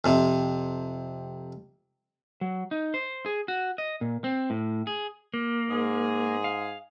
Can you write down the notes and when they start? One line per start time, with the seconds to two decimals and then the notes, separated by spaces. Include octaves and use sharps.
0.04 F2 C3
2.41 F#3
2.71 D#4
2.94 C5
3.26 G#4
3.48 F#4
3.78 D#5
4.01 A#2
4.24 C4
4.50 A2
4.87 G#4
5.34 A#3
5.70 G#2 G#4
6.44 F5